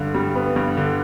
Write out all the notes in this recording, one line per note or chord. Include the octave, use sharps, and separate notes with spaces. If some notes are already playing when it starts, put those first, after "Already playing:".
Already playing: G2 D3
G3
B3
G2
D3